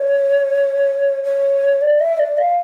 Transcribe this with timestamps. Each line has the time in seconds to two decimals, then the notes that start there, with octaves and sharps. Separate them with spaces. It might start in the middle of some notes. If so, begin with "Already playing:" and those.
Already playing: C#5
1.24 C#5
1.81 D5
1.99 E5
2.18 D5
2.37 F5